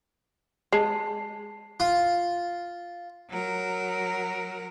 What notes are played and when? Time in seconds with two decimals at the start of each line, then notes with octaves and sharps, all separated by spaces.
0.72 G#3 A5 C7
1.80 F4
3.30 F#3 A#4